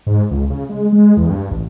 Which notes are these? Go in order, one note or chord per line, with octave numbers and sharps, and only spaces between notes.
G#2
C#2
C#3
G#3
G#3
E2
G2
A1